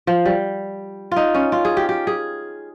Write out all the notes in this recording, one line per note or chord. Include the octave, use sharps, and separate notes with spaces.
F3
G3
D#4 F4
C#4
F4
G#4
G4
G4
G#4